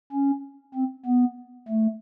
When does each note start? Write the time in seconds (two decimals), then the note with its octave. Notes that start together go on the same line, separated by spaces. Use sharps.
0.13 C#4
0.74 C4
1.06 B3
1.68 A3